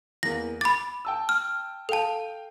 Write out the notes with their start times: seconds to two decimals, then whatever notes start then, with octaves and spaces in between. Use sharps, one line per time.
0.23 E2 A#3 A#6
0.61 B5 D6 A6
1.05 G5 A5 E6
1.29 F6
1.89 A4 F5 G5 A5